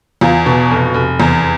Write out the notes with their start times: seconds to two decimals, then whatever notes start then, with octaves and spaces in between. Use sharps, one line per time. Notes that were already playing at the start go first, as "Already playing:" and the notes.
0.21 E2 F4
0.46 B2
0.71 F1
0.94 F1
1.20 E2